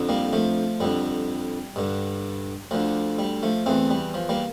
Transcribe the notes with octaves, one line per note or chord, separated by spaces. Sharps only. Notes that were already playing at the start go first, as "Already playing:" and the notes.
Already playing: F2 D3
G3 A#3
F3 A3
F2 D3 G3
G2 D3
D2 D3 F3
G3
F3 A3
E2 E3 A3 C4
G3
F3
G3 A#3